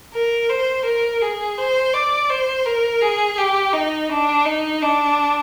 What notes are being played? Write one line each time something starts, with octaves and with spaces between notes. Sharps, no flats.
A#4
C5
A#4
G#4
C5
D5
C5
A#4
G#4
G4
D#4
D4
D#4
D4